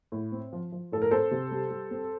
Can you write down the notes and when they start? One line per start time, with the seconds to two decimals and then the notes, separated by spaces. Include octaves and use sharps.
0.12 A2
0.32 C4
0.53 F3
0.72 F3
0.92 A2 A4
1.02 A#4
1.11 C4 A4 C5
1.31 C3
1.51 G3
1.71 G3
1.91 C4